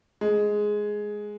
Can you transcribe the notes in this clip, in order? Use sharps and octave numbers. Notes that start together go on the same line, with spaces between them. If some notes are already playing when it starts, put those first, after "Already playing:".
G#3